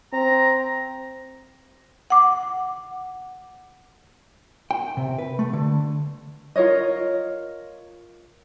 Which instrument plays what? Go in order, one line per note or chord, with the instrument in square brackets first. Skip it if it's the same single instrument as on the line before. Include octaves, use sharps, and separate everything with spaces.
[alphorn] C4 [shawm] A#5
[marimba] F#5 D6
[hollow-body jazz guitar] G5
C3
B4
A3
D3
[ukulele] F4 A#4 C#5 D#5